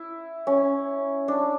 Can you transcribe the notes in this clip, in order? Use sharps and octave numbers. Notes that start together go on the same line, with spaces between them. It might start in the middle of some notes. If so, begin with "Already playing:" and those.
Already playing: E4
C#4
D4